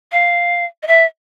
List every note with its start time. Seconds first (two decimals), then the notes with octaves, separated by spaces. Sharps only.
0.12 F5
0.83 D#5
0.88 E5